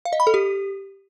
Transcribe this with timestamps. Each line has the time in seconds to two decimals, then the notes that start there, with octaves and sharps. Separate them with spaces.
0.05 F5
0.13 D#5
0.20 B5
0.27 A4
0.34 G4